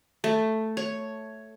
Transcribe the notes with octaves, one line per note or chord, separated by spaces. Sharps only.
A3
C#5